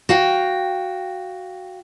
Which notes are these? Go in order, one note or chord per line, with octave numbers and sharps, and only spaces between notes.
F#4 F5 G5